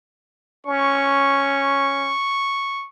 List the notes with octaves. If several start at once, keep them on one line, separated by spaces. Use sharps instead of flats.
C#4 C#6